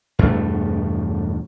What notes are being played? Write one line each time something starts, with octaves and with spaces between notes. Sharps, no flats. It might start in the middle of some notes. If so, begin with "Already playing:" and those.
E2 G2 B2 A3